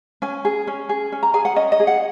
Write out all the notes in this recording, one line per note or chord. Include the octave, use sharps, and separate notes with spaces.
C#4 G#5
G#4
C#4
G#4
C#4
A#5
G#4 G#5
F#5
C#4 D#5
D#5
G#4
F#5